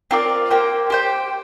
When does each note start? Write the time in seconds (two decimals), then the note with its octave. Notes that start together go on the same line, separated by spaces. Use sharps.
0.11 C4 F4 A#4 D5
0.51 A#3 G4 C5 G5
0.90 G4 C5 G5